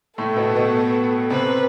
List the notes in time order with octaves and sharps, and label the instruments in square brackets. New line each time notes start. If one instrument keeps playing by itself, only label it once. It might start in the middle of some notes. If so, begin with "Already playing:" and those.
[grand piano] A2 A3 [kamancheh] A4
[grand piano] B2 B3
B2 B3
[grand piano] C3 C4 [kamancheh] B4